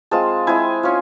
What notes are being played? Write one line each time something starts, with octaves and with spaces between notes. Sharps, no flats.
G#3 C4 F4 A5
G#3 C4 E4 G#5
C#4 F4